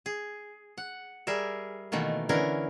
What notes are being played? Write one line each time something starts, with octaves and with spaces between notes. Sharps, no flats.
G#4
F#5
G3 G#4 A#4 E5
B2 D#3 E3 A3 A#3
D3 E3 C#4 E4 A#4